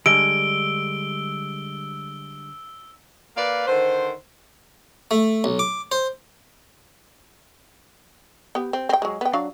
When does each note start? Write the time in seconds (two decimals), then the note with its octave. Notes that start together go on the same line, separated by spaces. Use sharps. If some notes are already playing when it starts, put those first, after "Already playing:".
0.06 D3 G3 G#3 E6 D7 G7
3.37 A#3 B4 D5 F5
3.67 D3 D#3 C5
5.11 A3
5.44 B1
5.59 D6
5.92 C5
8.55 B3 G4
8.73 C4
8.89 C4 G5
9.02 F#3 G#3
9.21 B3 G5
9.33 F#3 D4 F5